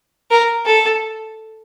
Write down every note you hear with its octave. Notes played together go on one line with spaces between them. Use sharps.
A#4
A4